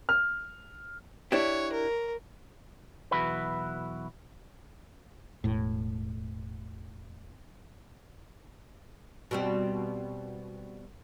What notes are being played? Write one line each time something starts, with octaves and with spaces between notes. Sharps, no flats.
F6
D4 E4 G4 C#5
A#4
B1 E2 E4 F#4 B4
E1 A2
B2 G3 C4